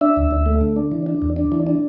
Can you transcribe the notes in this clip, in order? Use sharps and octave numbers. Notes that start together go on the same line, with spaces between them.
D4 E5
D2
D2
A3
D3
D4
E3
D4
E2
D4
E3
D4